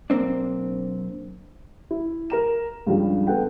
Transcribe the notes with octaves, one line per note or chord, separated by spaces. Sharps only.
B1 G2 A#3 C4 D4
E4
A#4 A#5 E7
C#2 G2 F3 G3
B3 A4 F#5 G5